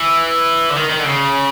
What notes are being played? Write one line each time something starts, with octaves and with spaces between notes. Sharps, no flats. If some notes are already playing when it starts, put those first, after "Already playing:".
Already playing: E3
D3
D#3
D#3
D3
C#3